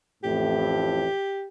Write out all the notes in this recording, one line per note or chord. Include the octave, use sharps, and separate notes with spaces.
A1 F2 A2 G4